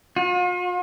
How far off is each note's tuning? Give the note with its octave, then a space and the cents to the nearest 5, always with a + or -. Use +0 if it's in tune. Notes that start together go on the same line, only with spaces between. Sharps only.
F4 +45